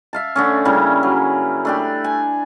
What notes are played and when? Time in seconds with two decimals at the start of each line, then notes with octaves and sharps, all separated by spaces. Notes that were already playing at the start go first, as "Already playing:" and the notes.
0.13 E5 F5 A5
0.36 D3 A3 C#4
0.65 C#3 G3 A#3 E4
1.03 F#3
1.65 A3 D4 G4
2.04 G#5